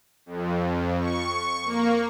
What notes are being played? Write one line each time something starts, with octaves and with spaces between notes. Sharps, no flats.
F2
C#6
A#3